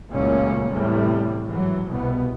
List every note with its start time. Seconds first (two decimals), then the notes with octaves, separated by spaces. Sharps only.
0.11 F#1 C#2 A#2 A3 A#3 C#4
0.69 E2 A2 C3 G3
1.45 G#1 E3 F#3
1.88 C2 B2 B3